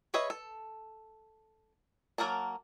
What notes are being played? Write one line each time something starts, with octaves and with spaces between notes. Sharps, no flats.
G#4 B4 C#5 D#5 E5
A4
F#3 A#3 A#4 F#5 A5